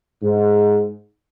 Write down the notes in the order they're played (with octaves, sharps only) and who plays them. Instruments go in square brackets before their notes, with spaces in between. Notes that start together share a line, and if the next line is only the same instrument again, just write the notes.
[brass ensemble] G#2